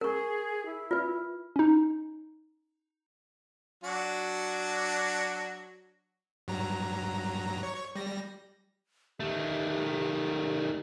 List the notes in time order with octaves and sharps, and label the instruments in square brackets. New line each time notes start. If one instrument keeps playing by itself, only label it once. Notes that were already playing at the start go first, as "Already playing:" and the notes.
[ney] G#4 [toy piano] A#4 C#6
[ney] E4
[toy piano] F4 B4
[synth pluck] C#4 D#4
[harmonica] F#3 D4 F#4
[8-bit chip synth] G2 F#3 A#5
C#5 C#6
G3 A#6
[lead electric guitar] D#3 A3 [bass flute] G4